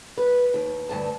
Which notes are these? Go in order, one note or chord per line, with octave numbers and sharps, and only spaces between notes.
B4
D#2
D2 G2 A5